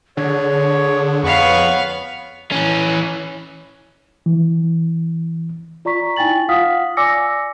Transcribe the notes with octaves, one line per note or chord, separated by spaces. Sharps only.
D3 G#4 C#5
F2 B3 B4 C#5 F5 C#6
E3 C#4
E3
F4 D5 A#5 C#6 B6
D#4 E4 G5 G#5 A6 F#7
F4 F5 F#5 D#6 F6 B6
D5 G#5 D6 E6 A#6 C#7